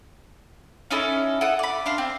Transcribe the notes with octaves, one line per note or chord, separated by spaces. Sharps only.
C#4 D#4 E4 A4
E4 A4 F#5 D#6
D5 B5
D4 F5 C6
C4